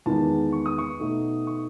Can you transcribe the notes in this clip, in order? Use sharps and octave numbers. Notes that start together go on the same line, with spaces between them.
E2 D#3 G#3 B3 A5
C#6
D#6
C#6
B2 A3 D#4
C#6